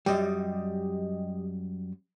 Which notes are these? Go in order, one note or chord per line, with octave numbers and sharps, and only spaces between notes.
F#2 G3 G4 D#5